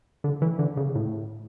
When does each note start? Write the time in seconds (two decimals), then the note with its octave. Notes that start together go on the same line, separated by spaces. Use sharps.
0.24 D3
0.42 E3
0.59 D3
0.77 C#3
0.95 A2